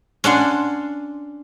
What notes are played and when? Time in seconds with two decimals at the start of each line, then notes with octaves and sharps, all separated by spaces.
0.24 C#4 D4 F#5 C6